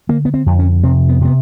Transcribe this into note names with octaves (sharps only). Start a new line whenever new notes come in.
D3 A#3
B3
C4
F2
C#4
C3 C4
B3
C3 B3